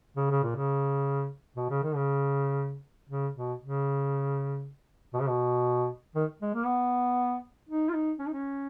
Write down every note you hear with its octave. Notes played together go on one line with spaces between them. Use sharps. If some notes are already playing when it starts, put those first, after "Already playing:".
C#3
C#3
A#2
C#3
B2
C#3
D#3
C#3
C#3
B2
C#3
B2
C#3
B2
D#3
G#3
A#3
B3
D#4
F4
D#4
C#4
D#4
C#4